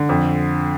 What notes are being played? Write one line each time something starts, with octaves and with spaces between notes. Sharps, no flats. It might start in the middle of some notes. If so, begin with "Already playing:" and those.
Already playing: D3
F2